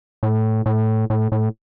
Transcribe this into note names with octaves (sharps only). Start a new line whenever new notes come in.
A2
A2
A2
A2